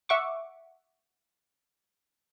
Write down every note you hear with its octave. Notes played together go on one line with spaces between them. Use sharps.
E5 F#5 C#6 D6